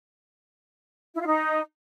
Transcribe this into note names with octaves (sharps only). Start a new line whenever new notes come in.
E4
F4
D#4